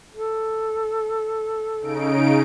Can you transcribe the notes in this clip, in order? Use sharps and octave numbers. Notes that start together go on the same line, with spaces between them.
A4
C#3 D#4 D7